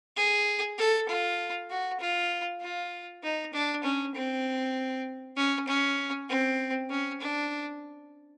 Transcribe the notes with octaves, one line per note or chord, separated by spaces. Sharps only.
G#4
A4
F4
F#4
F4
F4
D#4
D4
C#4
C4
C#4
C#4
C4
C#4
D4